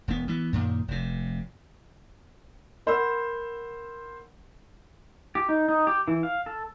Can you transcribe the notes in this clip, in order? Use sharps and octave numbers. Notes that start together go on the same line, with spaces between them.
E1 B3
E3 B3
F#2 A#2 D#3
F1 C3
A#4 C5 F#5 B5 C6 E6
G4
D#4
D#4
G4
E3
F5
A4